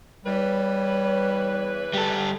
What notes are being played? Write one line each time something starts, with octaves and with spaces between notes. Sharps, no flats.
E2 E3 G3 B4 C#5
G3 A4